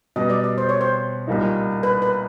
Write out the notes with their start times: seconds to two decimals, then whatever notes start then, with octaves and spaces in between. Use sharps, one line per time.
0.16 B2 G3 B3 D#5
0.30 D5
0.44 D5
0.58 C5
0.69 C#5
0.81 C5
1.27 C2 A#2 G3 A#3 D#4
1.83 B4
2.02 B4